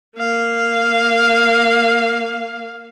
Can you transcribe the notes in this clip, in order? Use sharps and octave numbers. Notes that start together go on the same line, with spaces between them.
A#3 F5